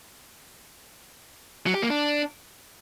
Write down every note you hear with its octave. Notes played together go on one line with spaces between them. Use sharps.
F#3
G4
A#3
D4